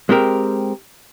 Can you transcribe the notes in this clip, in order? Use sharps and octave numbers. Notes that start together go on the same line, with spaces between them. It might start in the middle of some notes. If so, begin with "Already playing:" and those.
G#3 C4 G4 A#4